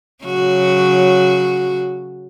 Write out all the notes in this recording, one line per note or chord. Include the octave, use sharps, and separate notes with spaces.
C#3 F#3 F#4